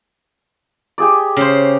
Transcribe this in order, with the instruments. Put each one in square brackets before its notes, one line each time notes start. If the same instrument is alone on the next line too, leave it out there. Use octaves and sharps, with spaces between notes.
[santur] G4 G#4 D5
[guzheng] C#3 C5